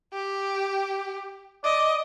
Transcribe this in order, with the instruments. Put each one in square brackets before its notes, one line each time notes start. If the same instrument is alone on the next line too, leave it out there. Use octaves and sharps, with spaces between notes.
[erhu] G4
[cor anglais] D5 [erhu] D#5